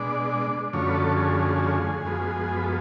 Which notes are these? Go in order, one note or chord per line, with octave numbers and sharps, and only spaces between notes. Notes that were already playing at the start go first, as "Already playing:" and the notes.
Already playing: B2 G#3 D4 D5
F#2 D3 F3 A3 C#4 C#5
B4
A4
G#4
F#2 F3 G#3 B3
B4
A4